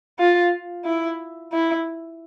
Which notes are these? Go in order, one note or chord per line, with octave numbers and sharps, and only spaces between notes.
F4
E4
E4